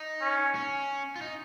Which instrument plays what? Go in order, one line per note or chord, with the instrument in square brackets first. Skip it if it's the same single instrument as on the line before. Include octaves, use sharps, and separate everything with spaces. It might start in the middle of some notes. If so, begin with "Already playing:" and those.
Already playing: [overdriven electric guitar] D#4
[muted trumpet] C#4
[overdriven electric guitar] C#4
F4
D#4